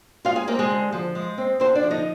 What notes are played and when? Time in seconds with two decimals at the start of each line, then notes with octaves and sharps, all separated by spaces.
0.25 G#3 F4 F5
0.36 G#4 G#5
0.48 A#3 C4 A#4
0.59 G#3 G#4
0.70 D3
0.92 F3
1.15 G#3
1.38 C4
1.60 D3 C4 C5
1.75 D4 D5
1.83 F3
1.91 D#4 D#5